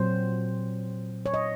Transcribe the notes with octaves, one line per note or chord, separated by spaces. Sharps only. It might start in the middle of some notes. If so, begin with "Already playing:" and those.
Already playing: A#2 F#3 C4 C5
C#5
D#5